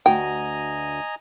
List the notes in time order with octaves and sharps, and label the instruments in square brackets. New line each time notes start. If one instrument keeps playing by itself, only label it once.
[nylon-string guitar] D2 F#4 [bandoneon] D#5 G#5 A#5 [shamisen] G5